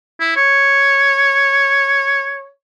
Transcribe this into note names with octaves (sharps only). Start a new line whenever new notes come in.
E4
C#5